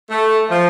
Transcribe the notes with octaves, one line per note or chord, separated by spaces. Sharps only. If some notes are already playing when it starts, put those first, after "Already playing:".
A3
F3